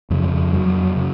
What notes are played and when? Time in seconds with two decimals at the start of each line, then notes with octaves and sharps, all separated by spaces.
0.10 F2 C#3 F3
0.53 F#2 F#3
0.96 C#3